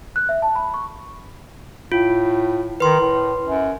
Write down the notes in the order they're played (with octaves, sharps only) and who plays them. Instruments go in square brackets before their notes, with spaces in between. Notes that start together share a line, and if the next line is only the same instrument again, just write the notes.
[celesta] F#6
E5
A5
B5
C#6
[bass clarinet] A2 [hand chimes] F4
[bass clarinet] D#3 [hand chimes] B4 C6
[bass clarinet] A2
F#2